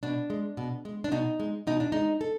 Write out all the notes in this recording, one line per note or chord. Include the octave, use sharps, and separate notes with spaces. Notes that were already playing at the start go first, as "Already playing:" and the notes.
B2 D4
G#3
B2
G#3
D4
B2 D#4
G#3
B2 D#4
D4
G#3 D#4
A4